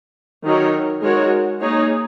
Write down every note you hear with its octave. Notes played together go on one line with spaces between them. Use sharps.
D#3 F#3 D#4 A#4 C#5
G#3 D#4 F#4 A#4 C#5
A#3 D#4 G#4 C#5